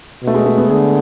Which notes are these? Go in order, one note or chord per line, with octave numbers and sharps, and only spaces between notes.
B2 A3
G#3
A3
B3
D3 G#4